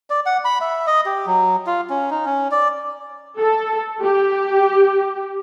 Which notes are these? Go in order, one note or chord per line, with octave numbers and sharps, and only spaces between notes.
D5
F#5
B5
E5
D#5
G4
F#3
F4
C#4
D#4
C#4
D5
A4
G4